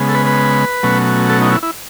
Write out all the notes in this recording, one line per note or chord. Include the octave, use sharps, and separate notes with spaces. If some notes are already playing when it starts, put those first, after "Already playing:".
Already playing: C#3 G#3 B3
A4
B4
B4
B2 F#3 A3 C#4
A4
D#4
E4
E4